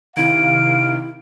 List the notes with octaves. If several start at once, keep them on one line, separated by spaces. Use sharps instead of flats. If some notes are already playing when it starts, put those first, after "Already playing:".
C3 D#3 E4 F5 D7